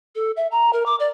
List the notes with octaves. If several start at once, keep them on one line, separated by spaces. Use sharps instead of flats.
A4
E5
A#5
A#4
D6
D5